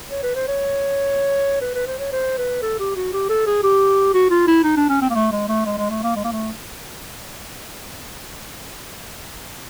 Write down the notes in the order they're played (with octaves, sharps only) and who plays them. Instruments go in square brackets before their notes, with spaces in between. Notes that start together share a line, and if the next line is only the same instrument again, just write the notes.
[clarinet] C#5
B4
C5
C#5
B4
B4
C5
C#5
C5
B4
A4
G4
F#4
G4
A4
G#4
G4
F#4
F4
E4
D#4
D4
C#4
C4
A#3
A3
G#3
A3
G#3
G#3
A3
A#3
G#3
A#3
A3